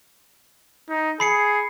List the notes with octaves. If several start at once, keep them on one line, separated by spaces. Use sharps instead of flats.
D#4
G#4 B5 C7 C#7